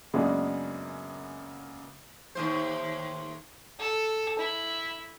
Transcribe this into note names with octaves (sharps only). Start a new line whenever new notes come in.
F#2 C#3 G#3 A#3 B3 D4
D#2 A2 C5
A4
E4